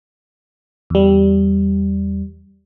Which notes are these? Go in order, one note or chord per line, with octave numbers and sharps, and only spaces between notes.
E2 G3